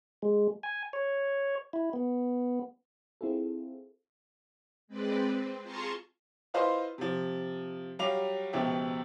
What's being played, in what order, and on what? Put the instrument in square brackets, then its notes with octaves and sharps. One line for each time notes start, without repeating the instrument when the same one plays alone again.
[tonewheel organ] G#3
G#5
C#5
E4
B3
[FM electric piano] C4 E4 F4 G#4 A4
[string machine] G#3 C4 B4 D5
C4
F4 G#4 A5 A#5 C6 C#6
[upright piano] E4 F4 B4 C5 D#5 F5
C3 F3
F#3 G3 F5 D6 F7
C#2 B2 F3 G4 E5